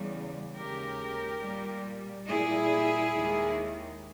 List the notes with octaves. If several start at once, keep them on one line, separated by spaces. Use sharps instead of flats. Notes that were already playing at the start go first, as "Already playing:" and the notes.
Already playing: E2 C#3 G3
D#2 C#3 G#3 G4 A#4
A#2 G3
A#2 G3 E4 G#4
D#2 D#3 G#3